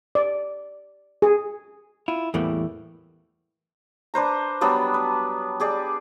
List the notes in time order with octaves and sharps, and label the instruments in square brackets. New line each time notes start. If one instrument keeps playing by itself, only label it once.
[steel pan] D5
G#4
[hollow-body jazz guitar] E4 F4
E2 A2 E3 G3 A3 A#3
[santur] D4 B4 C5 A#5
F#3 G3 B3 D4
B4
G4 G#4 D5